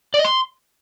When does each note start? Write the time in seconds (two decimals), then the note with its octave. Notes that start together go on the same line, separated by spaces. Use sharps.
0.14 D5
0.19 D#5
0.25 C6